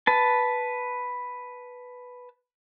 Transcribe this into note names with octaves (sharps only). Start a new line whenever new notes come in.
B4 A5